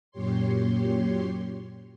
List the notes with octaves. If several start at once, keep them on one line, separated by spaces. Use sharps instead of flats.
F#2 A#2 G4 C#5 C6